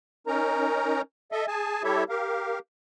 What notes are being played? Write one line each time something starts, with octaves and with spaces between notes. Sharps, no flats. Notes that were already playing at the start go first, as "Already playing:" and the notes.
C#4 D#4 A#4 A#5
A4 D#5 E5
G#4 G#5 A5
G3 E4 G4 A4 C#5 E5
G4 A#4 F5